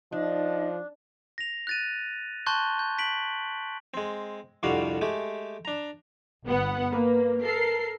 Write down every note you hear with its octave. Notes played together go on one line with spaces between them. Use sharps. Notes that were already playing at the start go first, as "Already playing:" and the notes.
F3 D4 D#4 D#5
A#6 F7
F#6 A6 D#7
A5 C6 C#6 F#6 G6 G7
G6
B6 D7 F#7
G#3 C4
C2 F2 D3 G3 F#4 F5
G#3 A3 G4
D4 A#5
G1 B3 F#5
A#3 B4
A4 A#4 C7